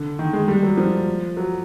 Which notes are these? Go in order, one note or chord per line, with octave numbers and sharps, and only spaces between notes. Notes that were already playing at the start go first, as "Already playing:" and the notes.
Already playing: D3
D#3
G#3
G3
F#3
F3
F#3